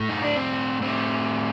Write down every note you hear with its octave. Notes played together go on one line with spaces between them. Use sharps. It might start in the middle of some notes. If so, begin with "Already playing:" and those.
Already playing: A2 A3
D#4
D4
C4
A2 A3 C4